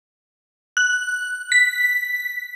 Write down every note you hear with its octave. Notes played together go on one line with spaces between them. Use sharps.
F#6
B6